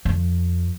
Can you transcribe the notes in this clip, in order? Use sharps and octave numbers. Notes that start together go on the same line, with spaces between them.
F2